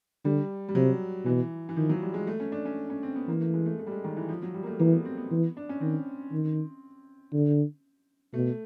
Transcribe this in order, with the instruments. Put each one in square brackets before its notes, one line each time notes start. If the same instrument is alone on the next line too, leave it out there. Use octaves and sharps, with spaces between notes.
[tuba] D3 [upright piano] G3
[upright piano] G3
[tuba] C3 [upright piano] F#3
[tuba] B2 [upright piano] E3
[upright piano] E3
[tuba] D#3 [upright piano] F3
[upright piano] F#3
G3
G#3
A3
C#4
D4
C#4
C#4
C4
B3
[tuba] E3 [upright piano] A#3
[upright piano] A3
G#3
A3
A3
G3
G#3
D#3
E3
F3
F#3
G3
A#3
A3
[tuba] E3 [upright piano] A#3
[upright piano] B3
C4
B3
[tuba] E3
[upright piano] D4
C#4
[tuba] D#3 [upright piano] C4
[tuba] D#3
D3
[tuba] B2 [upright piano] A3